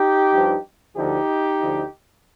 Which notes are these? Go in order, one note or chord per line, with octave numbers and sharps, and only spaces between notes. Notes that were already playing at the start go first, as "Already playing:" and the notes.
Already playing: D#4 G4
G2 F3
D2 D3 F3 D#4 G4
D2 D3 F3